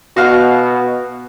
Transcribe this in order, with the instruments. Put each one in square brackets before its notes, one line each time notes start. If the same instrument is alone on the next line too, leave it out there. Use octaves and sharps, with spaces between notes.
[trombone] B2 [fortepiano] F#4 F5